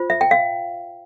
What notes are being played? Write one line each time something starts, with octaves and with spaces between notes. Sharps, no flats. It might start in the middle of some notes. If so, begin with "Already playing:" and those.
Already playing: F4 C5
E5
G5
F5